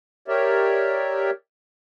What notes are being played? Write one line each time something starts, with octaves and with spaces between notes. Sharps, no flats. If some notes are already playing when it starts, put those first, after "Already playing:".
G4 A#4 C#5 D5 E5